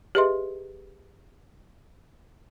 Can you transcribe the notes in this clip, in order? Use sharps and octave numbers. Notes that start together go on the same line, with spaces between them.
G4 G#4 B4 D#5 E5 C6